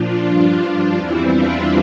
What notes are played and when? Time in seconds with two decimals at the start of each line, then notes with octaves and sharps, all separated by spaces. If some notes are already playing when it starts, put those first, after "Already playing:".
Already playing: A#2 F3 D4 F4
0.27 G2 F3 D4 F4
0.97 E2 E3 G3 C4 E4
1.33 D4 F4